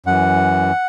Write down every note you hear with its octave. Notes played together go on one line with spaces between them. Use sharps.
F#2 E3 F#5